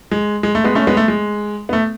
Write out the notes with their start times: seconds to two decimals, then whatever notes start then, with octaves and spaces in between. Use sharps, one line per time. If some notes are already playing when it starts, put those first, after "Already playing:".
0.11 G#3
0.43 G#3
0.55 A3
0.64 G#3 B3
0.75 A3 C#4
0.87 G#3 B3
0.97 A3
1.08 G#3
1.69 B3
1.73 A3